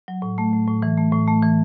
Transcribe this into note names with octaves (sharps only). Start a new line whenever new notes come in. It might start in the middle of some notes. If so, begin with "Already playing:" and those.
F#3
A2
A3
A2
A2
E3
A3
A2
A3
E3